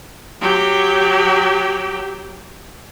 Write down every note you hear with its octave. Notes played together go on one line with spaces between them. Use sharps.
F#3 G4